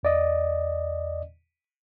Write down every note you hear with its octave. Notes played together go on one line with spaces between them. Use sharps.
E2 D5 D#5